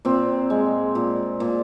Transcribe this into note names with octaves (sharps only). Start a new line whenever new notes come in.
A#2 C4
G#3
A#2
A#2